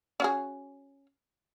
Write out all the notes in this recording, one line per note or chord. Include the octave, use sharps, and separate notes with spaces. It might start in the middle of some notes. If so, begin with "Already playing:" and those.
C#4 F#4 G#4